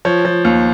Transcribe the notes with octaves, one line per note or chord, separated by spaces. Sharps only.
F3 C#5
F3
D#2